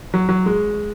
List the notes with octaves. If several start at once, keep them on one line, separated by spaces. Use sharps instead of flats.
F#3
F#3
G#3